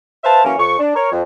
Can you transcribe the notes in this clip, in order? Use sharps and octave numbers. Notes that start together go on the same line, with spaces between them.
B4 C5 E5 F5 A5
E3 F#3 A#3 C#4
F2 C#6
D4
A#4 C#5
F2